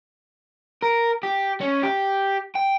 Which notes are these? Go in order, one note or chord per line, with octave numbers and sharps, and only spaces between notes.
A#4
G4
C#4
G4
G5